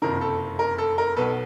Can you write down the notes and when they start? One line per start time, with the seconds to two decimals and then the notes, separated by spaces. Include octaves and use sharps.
0.02 F#1 F2 C3 D#3 A#4
0.21 A4
0.59 A#4
0.78 A4
0.98 A#4
1.17 B1 B2 A4 B4